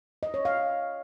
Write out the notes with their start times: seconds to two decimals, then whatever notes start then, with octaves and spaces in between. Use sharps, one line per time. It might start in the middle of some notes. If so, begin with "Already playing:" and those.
0.23 D#5
0.34 C#5
0.45 F5